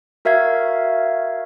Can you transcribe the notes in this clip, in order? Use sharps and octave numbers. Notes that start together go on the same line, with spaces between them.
F#4 A#4 E5 F5 G#6